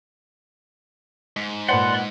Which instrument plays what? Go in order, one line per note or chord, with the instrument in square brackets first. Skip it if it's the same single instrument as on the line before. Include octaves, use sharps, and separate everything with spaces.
[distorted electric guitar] G#2 [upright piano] B6
[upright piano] A#2 B4 C5 [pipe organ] D5 C6 [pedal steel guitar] F#5